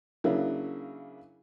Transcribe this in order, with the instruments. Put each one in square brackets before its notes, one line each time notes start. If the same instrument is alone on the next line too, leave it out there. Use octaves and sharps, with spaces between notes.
[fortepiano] C#3 F#3 A#3 D4 E4